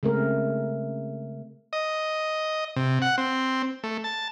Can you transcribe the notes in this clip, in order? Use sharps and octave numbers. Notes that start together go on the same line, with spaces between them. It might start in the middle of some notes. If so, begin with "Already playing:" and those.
C#3 G#3 A3 C4 A#4
D#5
C3
F#5
C4
A3
A5